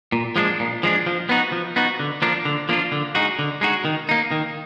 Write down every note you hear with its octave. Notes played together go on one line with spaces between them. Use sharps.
A#2
F3 G#3 B3 D4
A#2
F3 G#3 B3 D4
F3
B3 D#4 F#4
F3
B3 D#4 F#4
D3
F3 A#3 D4 F4
D3
F3 A#3 D4 F4
D3
G#3 D#4 F#4
D3
G#3 D#4 F#4
D#3
A#3 D#4
D#3